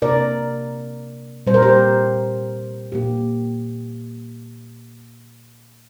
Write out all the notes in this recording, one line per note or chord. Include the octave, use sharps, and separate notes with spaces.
C3 A#3 D4 A#4 D5
A#2 G3 C4 C5
A#4
G4 C5
A#2 A#3 D4 G4